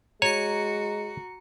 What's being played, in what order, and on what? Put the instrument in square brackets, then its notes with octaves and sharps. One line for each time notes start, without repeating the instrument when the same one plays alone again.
[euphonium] G#3 [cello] F#4 [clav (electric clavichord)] C#5 [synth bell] A#5 C#7